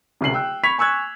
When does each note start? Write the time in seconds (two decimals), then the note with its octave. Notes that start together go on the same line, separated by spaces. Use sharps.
0.21 D1 C2 C#3 C7 F#7
0.34 G5 E6 F#6
0.63 B5 C#6 G#6 B6 F7
0.78 G#5 C#6 E6 F#6 G#6